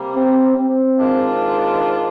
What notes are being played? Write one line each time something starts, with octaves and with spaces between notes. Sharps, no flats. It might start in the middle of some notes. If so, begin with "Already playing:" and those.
Already playing: C3 G3 A#3
C4
C4
G#2 D#3 G#3 D4 F4